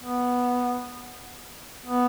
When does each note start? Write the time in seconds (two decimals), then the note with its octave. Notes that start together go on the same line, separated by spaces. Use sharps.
0.02 B3
1.86 B3